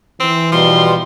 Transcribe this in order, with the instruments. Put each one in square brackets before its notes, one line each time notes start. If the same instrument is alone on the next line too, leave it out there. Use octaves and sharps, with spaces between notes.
[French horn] E3 [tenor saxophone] C4
[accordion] B2 G3 [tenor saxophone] F3 [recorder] C6